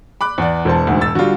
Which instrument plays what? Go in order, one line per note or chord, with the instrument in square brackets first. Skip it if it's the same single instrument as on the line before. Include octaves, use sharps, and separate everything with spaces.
[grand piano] B5 D6 F#6
E2 D5
[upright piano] E1 C5 A5
[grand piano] D2 G#2
E6 A6
[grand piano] D3 F4 [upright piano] G3 F#4